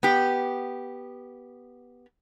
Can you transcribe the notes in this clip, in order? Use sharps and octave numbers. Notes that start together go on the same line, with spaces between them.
B3 G4